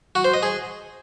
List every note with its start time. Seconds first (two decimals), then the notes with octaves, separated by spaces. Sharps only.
0.15 F#4
0.24 C5
0.34 D#5
0.43 G#4